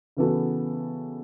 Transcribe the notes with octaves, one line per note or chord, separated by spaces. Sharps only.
C#3 E3 B3 F#4 A4